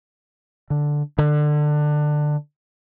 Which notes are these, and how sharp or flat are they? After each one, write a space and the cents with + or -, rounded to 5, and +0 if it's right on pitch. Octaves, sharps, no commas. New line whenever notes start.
D3 +0
D3 +20